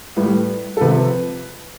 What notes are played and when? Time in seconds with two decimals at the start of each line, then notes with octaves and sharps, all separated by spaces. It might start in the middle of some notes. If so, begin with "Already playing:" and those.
0.17 A2 G3 B4
0.77 A4
0.81 C3 F3 B4